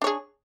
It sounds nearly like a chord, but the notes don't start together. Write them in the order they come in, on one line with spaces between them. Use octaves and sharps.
D4 C#5 G#4